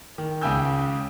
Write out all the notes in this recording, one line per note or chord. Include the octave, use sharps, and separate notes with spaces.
D#3
C#2 C#3 G5 G#5 E6 G6